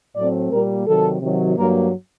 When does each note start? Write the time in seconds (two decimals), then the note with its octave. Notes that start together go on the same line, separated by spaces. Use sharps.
0.16 A2 F#3 A3 C4 D5
0.51 A#2 G3 A#3 A#4
0.87 C3 D#3 F#3 A4
1.21 C3 D#3 F#3
1.56 G2 F#3 A#3 A#4